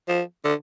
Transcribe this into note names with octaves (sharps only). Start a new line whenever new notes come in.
F3
D3